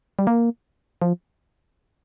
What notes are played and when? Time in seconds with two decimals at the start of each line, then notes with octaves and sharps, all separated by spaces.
0.19 G3
0.27 A#3
1.02 F3